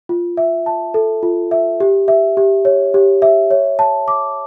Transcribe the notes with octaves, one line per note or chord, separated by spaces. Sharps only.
F4
E5
A5
A4
F4
E5
G4
E5
G4
C#5
G4
E5
C#5
A5
D6